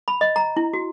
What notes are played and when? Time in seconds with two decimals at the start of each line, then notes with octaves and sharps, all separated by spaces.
0.08 B5
0.21 D#5
0.36 A#5
0.57 E4
0.74 F#4